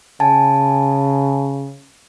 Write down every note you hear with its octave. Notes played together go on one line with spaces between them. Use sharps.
C#3 G#5 A5